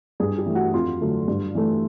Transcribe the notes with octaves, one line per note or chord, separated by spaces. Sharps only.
G2 G#4
G4
E3 A3
F#4
F2 F4
D3 F#3 A3
G2
E3 A3